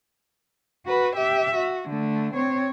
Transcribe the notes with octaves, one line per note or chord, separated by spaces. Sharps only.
F#4 B4
G4 E5
F#4
D3 A3
C4 C#5